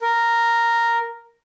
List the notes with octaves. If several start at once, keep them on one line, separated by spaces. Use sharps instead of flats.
A#4